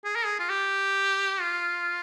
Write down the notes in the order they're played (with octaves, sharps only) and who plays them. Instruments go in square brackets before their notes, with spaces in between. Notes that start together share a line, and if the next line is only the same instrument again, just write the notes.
[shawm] G#4
A#4
G#4
F4
G4
F4